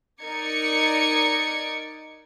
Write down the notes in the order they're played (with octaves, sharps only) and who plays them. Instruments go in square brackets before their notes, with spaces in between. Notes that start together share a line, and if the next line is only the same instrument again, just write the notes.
[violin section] D#4 A#4 D5 G#6 C#7